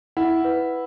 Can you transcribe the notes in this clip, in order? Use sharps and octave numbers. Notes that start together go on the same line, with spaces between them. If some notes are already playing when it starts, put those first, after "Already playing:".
E4 F#5
B4